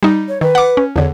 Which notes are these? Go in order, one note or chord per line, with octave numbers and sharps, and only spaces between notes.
G3 D#4
C#5
D#3 B4
F#5 D6
C#4
E2 D3 C#5